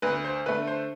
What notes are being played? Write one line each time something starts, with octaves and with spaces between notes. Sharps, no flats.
D2 B4
C5
D3 A3 B4
C5